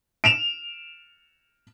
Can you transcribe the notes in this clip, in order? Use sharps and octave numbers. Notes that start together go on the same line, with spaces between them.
D7 E7 F7